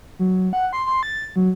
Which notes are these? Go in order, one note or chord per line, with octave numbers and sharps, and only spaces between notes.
F#3
F#5
C6
C6
A6
F#3